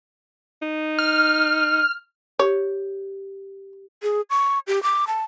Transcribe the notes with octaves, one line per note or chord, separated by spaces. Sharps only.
D#4
F6
G4 C#5
G#4
C#6
G4
D6
A5